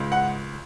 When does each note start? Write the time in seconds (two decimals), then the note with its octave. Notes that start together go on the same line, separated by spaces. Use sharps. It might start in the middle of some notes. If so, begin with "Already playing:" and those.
Already playing: C#2 G#2
0.12 F#5